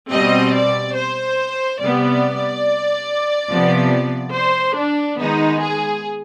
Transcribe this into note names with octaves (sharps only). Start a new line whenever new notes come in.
B2 G3 C4 D#5
D5
C5
C3 G3 B3 D5
C3 F3 B3
C5
D4
D#3 G#3 B3 D#4
G#4